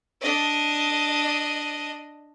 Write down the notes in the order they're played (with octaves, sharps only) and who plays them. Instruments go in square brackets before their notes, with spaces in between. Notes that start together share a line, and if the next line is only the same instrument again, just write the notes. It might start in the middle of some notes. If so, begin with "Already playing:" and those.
[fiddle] D4 D#5